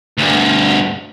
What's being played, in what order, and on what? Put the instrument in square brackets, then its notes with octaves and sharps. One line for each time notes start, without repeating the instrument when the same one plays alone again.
[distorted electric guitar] D2 G2